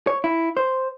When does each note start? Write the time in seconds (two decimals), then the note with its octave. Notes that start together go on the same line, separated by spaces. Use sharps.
0.07 C#5
0.24 E4
0.57 C5